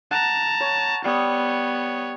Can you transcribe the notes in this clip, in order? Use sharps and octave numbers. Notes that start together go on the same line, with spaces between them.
F#5 A5 A#5
C#5
G3 B3 C#5 D#6